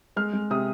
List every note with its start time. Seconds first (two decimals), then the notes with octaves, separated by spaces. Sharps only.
0.16 G#3 F6
0.33 G#3
0.51 C3 D#6